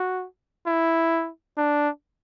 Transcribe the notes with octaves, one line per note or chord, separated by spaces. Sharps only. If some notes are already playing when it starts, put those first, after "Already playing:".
Already playing: F#4
E4
D4